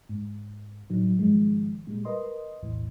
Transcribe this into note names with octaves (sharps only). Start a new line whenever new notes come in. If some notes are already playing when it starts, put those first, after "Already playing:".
G#2
A2 F#3 D#4
G#2 D#3 F3 G#3
A#2 G3 G#3
A#4 B4 D#5 C6
B1 E2 A2 E3